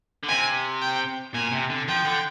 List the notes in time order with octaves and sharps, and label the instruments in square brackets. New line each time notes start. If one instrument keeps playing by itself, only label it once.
[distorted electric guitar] D3
[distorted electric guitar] C3 [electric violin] G#5
[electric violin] G5
[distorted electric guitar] A#2 [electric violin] G#5
[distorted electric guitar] C3
D3
[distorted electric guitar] F3 [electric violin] G5
[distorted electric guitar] D3